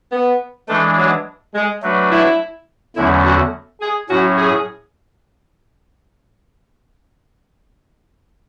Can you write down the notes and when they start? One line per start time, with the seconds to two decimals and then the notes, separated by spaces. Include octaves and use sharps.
0.12 B3
0.68 E3 G#3 A3 D4
0.97 F#3
1.55 G#3
1.82 F#3 A3 D4 F#4 B4
2.11 E4
2.95 E2 D3 F#3 A3 C#4 E4
3.25 F#4
3.81 G#4
4.09 A2 F#3 C#4 F#4
4.37 G#4